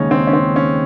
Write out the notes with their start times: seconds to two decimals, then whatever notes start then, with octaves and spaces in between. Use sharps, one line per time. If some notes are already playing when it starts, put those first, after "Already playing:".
Already playing: D#2 C#3 G#3 C#4 D#4
0.11 C4
0.27 C#4
0.33 C4
0.56 C#4